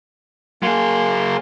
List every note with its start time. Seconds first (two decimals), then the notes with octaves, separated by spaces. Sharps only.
0.63 F#3 A#3 G#4 C6